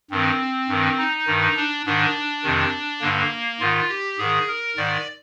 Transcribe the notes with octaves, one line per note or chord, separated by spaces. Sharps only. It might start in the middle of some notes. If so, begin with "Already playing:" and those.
G2 D#3 C4
G2 D#3
D#4
G2 D#3
D4
G#2 D#3 D4
F2 C3 D#3
G2 D3 A#3
G#2 D#3 F4
G4
G#2 D#3 G#4
A#4
G#2 D#3 D5